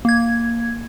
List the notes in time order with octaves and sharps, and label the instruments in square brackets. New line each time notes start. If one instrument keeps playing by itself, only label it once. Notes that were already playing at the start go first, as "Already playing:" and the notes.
[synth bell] A#3 G#6